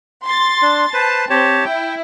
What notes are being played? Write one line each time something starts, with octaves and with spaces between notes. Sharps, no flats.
C6 A6
D4
B4 C5 A5
C4 G4 C#5 A5
E4 G5